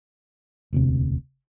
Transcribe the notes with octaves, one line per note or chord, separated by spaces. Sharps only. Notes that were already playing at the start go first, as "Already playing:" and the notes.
E1 D2 C3